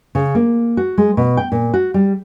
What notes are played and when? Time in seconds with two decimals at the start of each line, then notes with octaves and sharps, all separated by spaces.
0.15 C#3
0.35 A#3
0.77 F#4
0.98 G#3
1.17 B2
1.37 G5
1.52 A#2
1.74 F#4
1.94 G3